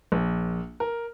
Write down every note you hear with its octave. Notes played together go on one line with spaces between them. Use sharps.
A#1
A#4